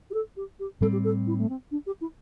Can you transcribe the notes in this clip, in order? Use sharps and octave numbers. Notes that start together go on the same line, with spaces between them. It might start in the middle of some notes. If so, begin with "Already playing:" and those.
G4
A4
G4
G4
A2 G3 C4 A4
G4
A4
E4
A3
C4
D4
G4
E4